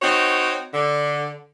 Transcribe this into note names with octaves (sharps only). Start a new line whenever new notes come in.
C4 D#4 F#4 C#5
D3